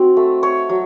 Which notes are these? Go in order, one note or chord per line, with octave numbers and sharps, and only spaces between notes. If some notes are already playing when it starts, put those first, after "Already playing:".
Already playing: C4 D#4 F#4
A3
C#5
F#3